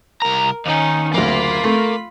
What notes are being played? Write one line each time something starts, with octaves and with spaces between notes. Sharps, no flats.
C2 A#4 A#5
D#2 D#3 C#4 D#4
F#1 D2 A#3 F4 B5
A3